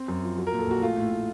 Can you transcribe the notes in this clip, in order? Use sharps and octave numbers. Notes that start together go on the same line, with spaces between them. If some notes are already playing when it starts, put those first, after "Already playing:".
Already playing: C4
F#2
F3
F#3
A#4
A#2
A4
A#1 F#4
A3 F4
A2
A2